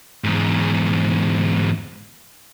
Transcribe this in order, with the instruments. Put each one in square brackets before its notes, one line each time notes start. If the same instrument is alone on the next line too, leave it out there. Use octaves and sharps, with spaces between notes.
[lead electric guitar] E2 G#2